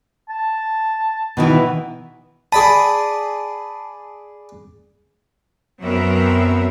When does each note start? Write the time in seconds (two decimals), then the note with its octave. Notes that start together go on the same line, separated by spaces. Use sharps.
0.29 A5
1.37 B2 D#3 E3
2.52 G#4 D5 A5 B5
5.83 F#2 F#3 B3 C4 A#4 E5